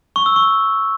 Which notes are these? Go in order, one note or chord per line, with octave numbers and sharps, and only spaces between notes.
C#6
E6
C#6